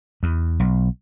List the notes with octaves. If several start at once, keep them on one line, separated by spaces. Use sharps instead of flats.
E2
B1